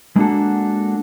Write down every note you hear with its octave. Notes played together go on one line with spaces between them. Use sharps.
G#3 A#3 D4 F#4 A4